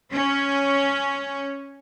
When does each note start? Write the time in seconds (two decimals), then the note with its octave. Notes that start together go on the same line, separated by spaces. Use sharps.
0.12 C#4